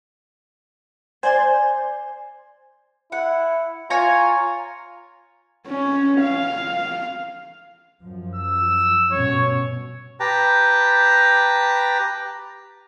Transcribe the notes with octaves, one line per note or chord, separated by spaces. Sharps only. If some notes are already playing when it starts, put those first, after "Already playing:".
C5 D5 G#5 C6
E4 F#5
F4 C#5 G#5 A#5
C#4
F5
F#2 F3
E6
G2 B2 C#4 C#5
G4 B4 G5 A5 A#5